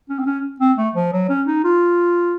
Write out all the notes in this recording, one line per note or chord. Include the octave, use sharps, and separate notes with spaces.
C#4
C4
C#4
C4
A3
F3
F#3
C#4
D#4
F4